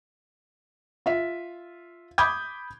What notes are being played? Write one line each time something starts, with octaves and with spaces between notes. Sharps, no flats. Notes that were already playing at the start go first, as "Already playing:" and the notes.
F4 E5
B5 D6 D#6 G6 G#6